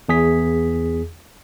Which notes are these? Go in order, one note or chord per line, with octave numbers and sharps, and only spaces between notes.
E2 G#4 B6